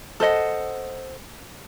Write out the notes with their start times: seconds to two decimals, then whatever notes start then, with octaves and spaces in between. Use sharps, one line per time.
0.20 A4 C5 D#5 F#5